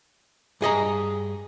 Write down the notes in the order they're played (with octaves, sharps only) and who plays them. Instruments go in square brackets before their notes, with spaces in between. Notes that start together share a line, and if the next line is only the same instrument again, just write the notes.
[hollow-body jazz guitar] G2 G#4 D#5 A#5